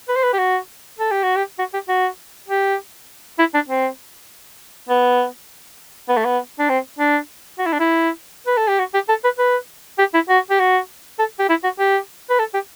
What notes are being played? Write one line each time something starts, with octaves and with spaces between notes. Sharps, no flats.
B4
C5
B4
G4
F#4
A4
G4
F#4
G4
F#4
G4
F#4
G4
E4
D4
C4
B3
B3
A3
B3
D4
C4
D4
F#4
E4
D4
E4
B4
A4
G4
F#4
G4
A4
B4
B4
G4
E4
F#4
G4
F#4
A4
G4
E4
F#4
G4
B4
A4
G4